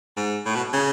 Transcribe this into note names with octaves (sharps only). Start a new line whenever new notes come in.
G#2
A2
B2
C#3